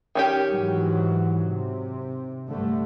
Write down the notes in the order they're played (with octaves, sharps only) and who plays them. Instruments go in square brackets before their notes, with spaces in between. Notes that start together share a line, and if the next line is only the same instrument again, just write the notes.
[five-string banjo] D#3 C#4 G4
[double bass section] G#2 E3 F#3
C3
G2 D3 A3